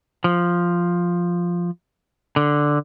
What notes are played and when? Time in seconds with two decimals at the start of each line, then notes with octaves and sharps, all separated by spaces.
0.24 F3
2.36 D3